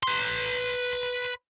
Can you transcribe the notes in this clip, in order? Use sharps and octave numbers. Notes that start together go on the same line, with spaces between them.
B4 C6